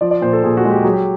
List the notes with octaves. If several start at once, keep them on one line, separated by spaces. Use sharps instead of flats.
F3 D5
D5
A#2 C5
A4
A#2 G#4
F#4
G#3
G4
F#3 G#4
G4
G#4